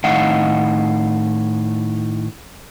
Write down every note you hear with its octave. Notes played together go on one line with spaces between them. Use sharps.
A2 D#3 D#4 D#5 F5 F#5